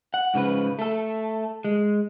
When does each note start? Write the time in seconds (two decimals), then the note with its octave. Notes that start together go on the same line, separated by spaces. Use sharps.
0.14 F#5
0.34 G#2 C#3 F3 B4
0.79 A3 A4
1.65 G#3